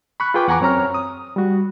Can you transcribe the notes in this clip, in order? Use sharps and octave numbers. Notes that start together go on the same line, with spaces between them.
B5 C#6 F#6
F4 G#4 B4 G5 D6
E2 F#5 G#5 A#5 C#6 D6
F#2 C4 C#5 A#5 F6
D#6
G3 F#4